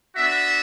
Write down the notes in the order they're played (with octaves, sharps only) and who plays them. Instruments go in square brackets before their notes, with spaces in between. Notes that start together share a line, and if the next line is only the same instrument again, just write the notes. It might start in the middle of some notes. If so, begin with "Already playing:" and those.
[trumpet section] B3 D4 F#4 E5